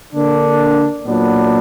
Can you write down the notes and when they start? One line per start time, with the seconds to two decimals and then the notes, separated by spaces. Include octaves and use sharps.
0.13 D3 A#3 D4
1.06 A#2 F#3 B3 D4